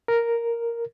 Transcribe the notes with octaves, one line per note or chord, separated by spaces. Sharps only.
A#4